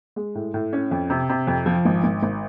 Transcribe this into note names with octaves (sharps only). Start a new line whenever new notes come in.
G#3
A2
A2
C#4
F2
C3
C3
F2
F3
G#1
G#1
G#1